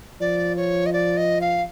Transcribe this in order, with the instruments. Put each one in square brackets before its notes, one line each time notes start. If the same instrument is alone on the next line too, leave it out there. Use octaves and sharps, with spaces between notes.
[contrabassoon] F3 [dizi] D5
[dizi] C#5
D#5
D5
D#5
F5